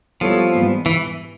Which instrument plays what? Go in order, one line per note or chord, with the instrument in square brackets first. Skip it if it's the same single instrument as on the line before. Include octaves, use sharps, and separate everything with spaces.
[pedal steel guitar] F3 [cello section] G3 B3 E4 A4 C#5
[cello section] G#2 E3 G3 B3
[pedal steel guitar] E3